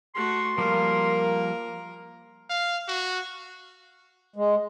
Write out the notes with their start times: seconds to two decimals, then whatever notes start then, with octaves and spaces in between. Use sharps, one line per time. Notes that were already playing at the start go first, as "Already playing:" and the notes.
0.15 A3 F#4 C6
0.58 F3 G3 A#3 A#4
2.50 F5
2.88 F#4
4.36 G#3